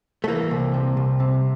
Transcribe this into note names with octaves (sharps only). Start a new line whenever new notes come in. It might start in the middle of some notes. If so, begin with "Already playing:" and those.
A3
E3 A#3
C2
C3
C2
C3